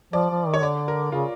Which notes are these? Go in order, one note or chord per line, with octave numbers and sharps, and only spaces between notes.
F3 D5
F3
D#3
C#5
D3 D5
A#4
C#3 F4